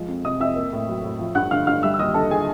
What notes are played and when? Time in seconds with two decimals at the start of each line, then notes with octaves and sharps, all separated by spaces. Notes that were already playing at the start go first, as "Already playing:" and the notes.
Already playing: F3 G#3
0.08 F2
0.25 C3 D#5 D#6
0.40 F2 E5 E6
0.56 A#3
0.73 A2
0.89 F#3
1.04 A2
1.19 F3
1.35 G2 F#5 F#6
1.51 D3 F5 F6
1.67 G2 F5 F6
1.83 G3 E5 E6
1.94 E6
1.99 D#2 D#5 D#6
2.14 D3 A4 A5
2.31 G#4 G#5